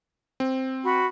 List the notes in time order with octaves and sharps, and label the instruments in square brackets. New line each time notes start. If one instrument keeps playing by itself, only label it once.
[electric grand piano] C4
[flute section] F#4 B5